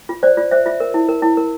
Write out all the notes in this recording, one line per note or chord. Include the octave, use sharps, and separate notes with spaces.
F4
C5 D5
F4 D5
C5 E5
F4 E5
A#4
E4
A#4
E4
A#4